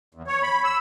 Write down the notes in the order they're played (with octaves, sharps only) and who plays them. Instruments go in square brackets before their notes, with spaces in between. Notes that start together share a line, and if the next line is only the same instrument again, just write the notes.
[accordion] E2
C#5
B5
E6